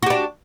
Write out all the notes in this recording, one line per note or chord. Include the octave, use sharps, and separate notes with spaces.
D4 F#4 G4